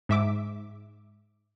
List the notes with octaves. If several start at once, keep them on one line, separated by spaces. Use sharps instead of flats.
G#2 E5 D6